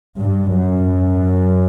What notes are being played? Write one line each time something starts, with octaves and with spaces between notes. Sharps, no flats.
G2
F#2